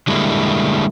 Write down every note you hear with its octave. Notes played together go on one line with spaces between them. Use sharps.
D3 G3 G#3 A#3 E4